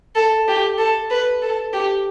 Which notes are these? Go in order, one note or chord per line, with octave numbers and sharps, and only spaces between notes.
A4
G4
A4
B4
A4
G4